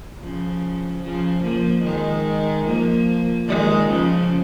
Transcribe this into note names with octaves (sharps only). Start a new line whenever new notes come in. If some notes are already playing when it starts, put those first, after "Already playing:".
C#3 F3
C#3 F3
F3 A#3
D#3 G#3
F3 A#3
D#3 G#3
C#3 F3